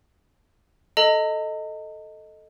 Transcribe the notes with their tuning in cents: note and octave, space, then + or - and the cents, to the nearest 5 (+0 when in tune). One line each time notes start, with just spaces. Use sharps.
A4 +0 D#5 +0 A#5 -45